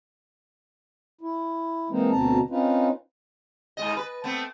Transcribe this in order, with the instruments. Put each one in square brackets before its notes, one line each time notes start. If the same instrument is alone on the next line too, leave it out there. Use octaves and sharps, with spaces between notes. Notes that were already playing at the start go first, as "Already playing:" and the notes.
[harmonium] E4
E3 G#3 A#3 C4 D#4
D2 B2 C4 A5 A#5
C4 C#4 D#4 F4 B4
[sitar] G#2 G#3 D#5
B4
A3 B3 C4